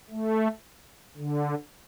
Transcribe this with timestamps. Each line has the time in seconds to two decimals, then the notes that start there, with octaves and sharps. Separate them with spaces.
0.10 A3
1.17 D3